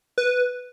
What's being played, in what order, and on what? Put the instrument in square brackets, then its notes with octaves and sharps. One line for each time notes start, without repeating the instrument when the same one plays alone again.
[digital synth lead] B4